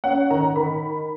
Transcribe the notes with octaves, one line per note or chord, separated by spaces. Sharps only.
C#4 F#5
D#3 A#5
D#3 B5